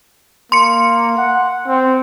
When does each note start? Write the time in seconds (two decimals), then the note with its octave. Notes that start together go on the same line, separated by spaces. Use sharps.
0.52 A#3 C6 C#7
1.18 F#5
1.67 C4